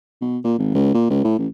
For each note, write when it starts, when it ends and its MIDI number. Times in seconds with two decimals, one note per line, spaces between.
0.21 0.38 47
0.44 0.54 46
0.58 0.72 32
0.74 0.93 37
0.94 1.05 46
1.10 1.22 37
1.24 1.38 45
1.39 1.47 33